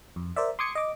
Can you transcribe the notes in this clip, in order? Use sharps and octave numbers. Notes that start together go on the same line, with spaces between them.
F2
A#4 C5 D5 E5
C6 D6 D#6 G#6 C#7
D#5 D6